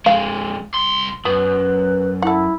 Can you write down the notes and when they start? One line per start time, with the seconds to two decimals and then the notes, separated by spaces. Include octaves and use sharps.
0.06 F2 G#3 F5
0.74 C2 C6
1.25 F#2 B3 B4
2.22 E4 A4 F#5